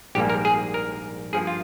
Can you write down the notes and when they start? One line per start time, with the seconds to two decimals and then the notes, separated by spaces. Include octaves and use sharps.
0.15 A#1 G#2 G3 A#3 G4
0.30 A#4
0.45 G#4
0.74 A#4
1.33 G2 F3 A#3 G#4
1.47 F4